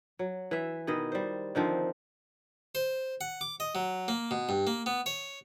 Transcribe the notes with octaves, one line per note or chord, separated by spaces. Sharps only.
F#3
E3 E5
B2 D#3 E4 D#5
G3 C5
D3 D#3 F3 C4
C5
F#5
D6
D#5
F#3
A#3
B2
G2
A#3
B3
C#5